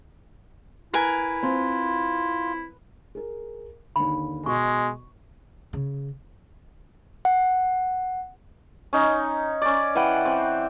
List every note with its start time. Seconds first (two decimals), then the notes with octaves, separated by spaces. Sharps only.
0.94 E4 A#4 B4 G#5
1.43 C4 F4
3.15 G#4 A#4
3.96 D#2 D3 B5
4.46 B2 G#3 F#4 C#6
5.73 C#3
7.25 F#5
8.93 C#4 D#4
9.62 C#4 D5
9.95 E3 B4 F#5 G5
10.26 C4